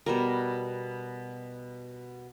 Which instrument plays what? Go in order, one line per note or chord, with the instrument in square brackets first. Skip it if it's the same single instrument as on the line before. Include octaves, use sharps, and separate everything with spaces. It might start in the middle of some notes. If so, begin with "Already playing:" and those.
[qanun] B2 G3 A#4